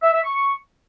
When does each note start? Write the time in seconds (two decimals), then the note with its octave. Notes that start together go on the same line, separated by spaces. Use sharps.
0.03 E5
0.14 E5
0.24 C#6